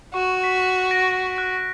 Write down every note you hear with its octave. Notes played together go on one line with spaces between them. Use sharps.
F#4 C#6
B6
A#6 D7
F#6